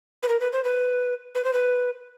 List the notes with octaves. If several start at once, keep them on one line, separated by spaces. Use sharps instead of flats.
B4
A#4
B4
C5
B4
B4
C5
B4